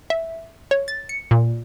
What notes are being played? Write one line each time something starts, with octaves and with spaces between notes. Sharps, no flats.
E5
C#5
A6
C#7
A#2